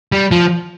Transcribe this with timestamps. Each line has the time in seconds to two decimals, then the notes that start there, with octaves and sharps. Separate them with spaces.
0.12 G3
0.31 F3